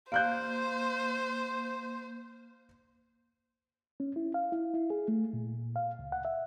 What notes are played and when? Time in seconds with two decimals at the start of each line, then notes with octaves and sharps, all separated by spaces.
0.12 A#3 C5 F5 F#6 G6
4.00 C#4
4.16 E4
4.34 F5
4.52 E4
4.74 E4
4.90 G#4
5.08 A3
5.33 A#2
5.76 F5
5.99 C#2
6.12 F#5
6.25 E5